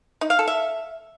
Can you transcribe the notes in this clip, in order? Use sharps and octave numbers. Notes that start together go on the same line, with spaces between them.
D#4
F5
A4
E5